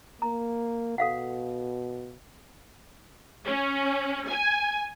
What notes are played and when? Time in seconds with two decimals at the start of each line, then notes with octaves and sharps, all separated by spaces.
0.22 A#3 A#5
0.98 B2 A4 F5 F#5
3.45 C#4
4.29 G#5